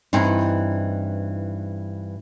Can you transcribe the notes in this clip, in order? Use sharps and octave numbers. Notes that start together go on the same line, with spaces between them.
G2 E3 C4 D#4 E4